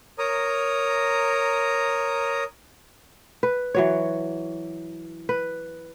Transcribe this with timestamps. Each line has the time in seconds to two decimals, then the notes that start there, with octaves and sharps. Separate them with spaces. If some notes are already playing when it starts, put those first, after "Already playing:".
0.19 A#4 C#5 A#5 D#6
3.43 B4
3.74 E3 F#3 C#5
5.29 B4